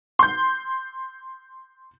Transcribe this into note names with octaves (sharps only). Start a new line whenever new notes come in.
C6 G6